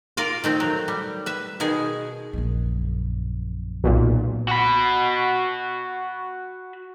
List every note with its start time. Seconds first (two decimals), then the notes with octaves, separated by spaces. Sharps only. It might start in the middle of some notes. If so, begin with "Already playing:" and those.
0.17 F4 A#4 D5 F5
0.44 D#3 A3 C4
0.60 F#3
0.88 G3
1.26 B4 E5
1.60 B2 D#3 G#4 G#5
2.33 A#1 F#2
3.84 B1 A#2
4.48 F#4 B5